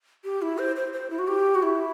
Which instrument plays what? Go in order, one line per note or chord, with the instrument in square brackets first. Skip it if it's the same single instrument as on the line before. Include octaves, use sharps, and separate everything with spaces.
[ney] G4
E4
C5
C5
C5
E4
F#4
G4
F#4
E4